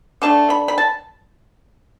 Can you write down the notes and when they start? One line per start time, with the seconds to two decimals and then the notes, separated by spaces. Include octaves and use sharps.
0.22 D3 A3 D4 A5
0.50 B5
0.68 B5
0.78 A5